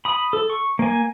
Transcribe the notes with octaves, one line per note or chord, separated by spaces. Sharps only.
B5 D#6
A4
C#6
A#3 G#5